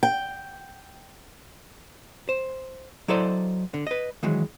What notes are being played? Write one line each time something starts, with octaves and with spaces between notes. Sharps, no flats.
G5
C5
F#3 E4 A4 C5 D5 D#5
D3
B4 D#5
D#3 E3 F#3 G#3